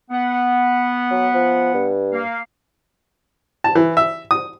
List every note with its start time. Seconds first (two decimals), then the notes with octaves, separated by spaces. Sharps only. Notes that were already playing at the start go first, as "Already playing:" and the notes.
0.11 B3 F#5
1.11 F#3
1.34 F3
1.74 G2
2.12 A#3 F5
3.64 A5
3.75 E3
3.97 E5
4.31 D#6